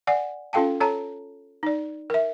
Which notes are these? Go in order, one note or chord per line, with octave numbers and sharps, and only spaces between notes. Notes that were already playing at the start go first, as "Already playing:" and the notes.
D5 F#5 G#5
C#4 F4 A4 F5 G5 A5
A4 C#5 A5 A#5
D#4 D5
A#4 E5